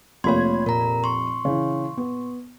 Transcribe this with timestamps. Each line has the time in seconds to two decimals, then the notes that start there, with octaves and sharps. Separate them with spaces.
0.24 F1 A3 A#3 F4 C#5 B5 C6 G#6
0.66 A#2 A#4 A#5
1.04 C6 C#6
1.45 C#3 E3
1.97 B3